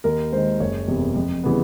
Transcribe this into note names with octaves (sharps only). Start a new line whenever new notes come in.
D#2 A#4
D#3 G#3 C5
F#1 C#5
E2 C3
F2
C#3 E3 G3 B3